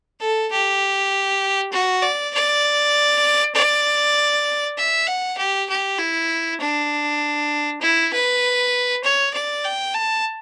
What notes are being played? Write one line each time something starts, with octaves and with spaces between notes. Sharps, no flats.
A4
G4
F#4
D5
D5
D5
E5
F#5
G4
G4
E4
D4
E4
B4
C#5
D5
G5
A5